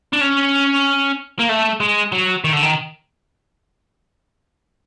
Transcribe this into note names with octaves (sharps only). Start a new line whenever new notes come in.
D4
C#4
A#3
A3
G#3
F#3
D#3
D3
D#3